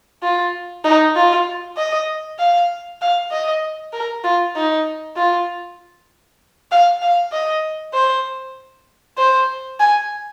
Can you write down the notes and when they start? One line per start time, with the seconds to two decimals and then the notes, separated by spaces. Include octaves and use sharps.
0.23 F4
0.84 D#4
1.16 F4
1.77 D#5
2.39 F5
3.01 F5
3.32 D#5
3.93 A#4
4.24 F4
4.56 D#4
5.16 F4
6.72 F5
7.02 F5
7.32 D#5
7.94 C5
9.18 C5
9.80 G#5